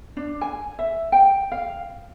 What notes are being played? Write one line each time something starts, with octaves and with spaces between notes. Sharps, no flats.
D4
G#5
E5
G5
F5